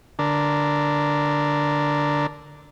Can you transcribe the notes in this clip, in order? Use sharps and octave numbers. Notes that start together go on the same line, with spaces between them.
D3 D4 A#4